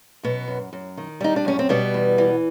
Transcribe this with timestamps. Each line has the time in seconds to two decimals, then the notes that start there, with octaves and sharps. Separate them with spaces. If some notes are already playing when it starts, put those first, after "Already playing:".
0.23 F#2 B2 B3
0.48 F#2
0.73 F#2
0.97 D#3
1.21 G3 D#4
1.36 D4
1.45 F#2 C#4
1.59 C4
1.69 B2 G3 B3
1.94 E2
2.18 E3